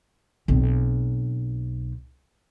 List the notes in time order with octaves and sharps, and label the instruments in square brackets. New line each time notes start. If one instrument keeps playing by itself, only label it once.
[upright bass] B1 C4